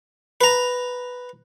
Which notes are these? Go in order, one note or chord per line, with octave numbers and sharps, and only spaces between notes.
B4 A#5